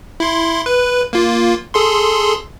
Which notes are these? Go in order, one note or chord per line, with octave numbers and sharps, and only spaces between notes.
E4 C6
B4
A#3 F4
G#4 A4 C6